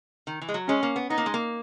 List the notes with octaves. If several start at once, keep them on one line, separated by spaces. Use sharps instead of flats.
D#3
E3
G#3
F#3
G#3 C#4
A#3
B3
B3 D#4
A#3
G#3
A#3